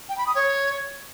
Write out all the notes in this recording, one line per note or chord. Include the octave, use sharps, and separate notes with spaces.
G5
B5
D#6
C#5